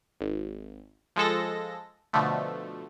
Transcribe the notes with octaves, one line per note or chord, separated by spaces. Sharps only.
G#1
F3 G#3 A4 A#6
B2 D3 F3 A3